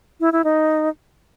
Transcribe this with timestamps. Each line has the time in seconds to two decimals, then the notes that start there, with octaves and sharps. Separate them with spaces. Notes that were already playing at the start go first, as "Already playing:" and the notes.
0.20 E4
0.32 E4
0.44 D#4